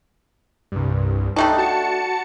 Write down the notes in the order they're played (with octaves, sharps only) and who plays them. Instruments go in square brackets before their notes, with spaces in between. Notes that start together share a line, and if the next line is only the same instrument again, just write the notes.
[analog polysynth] C2 G2
[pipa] G3 A3 D4 [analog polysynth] D#4
[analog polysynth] F#4 A5 C#7